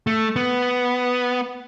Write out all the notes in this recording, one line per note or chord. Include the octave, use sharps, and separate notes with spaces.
A3
B3